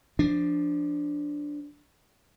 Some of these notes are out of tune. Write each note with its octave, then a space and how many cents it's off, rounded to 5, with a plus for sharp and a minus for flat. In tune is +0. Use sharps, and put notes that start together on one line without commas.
F3 +0 D4 +0